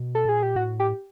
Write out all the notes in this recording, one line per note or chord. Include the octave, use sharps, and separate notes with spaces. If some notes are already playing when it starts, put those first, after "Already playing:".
Already playing: B2
A4
A#2 G#4
G4
A2 F#4
G4